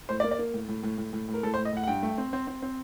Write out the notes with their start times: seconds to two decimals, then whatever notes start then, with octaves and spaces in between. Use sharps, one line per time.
0.09 A2 C5
0.20 D5
0.24 A#3
0.31 D5
0.39 A#3
0.54 A2
0.68 A2
0.83 A2
0.98 A2
1.13 A2
1.28 A2
1.34 A#4
1.43 A2 A4
1.54 C5
1.58 A2
1.65 D#5
1.73 A2 F#5
1.83 F#5
1.87 G2 G5
2.03 A3
2.18 C4
2.33 C4
2.47 C4
2.62 C4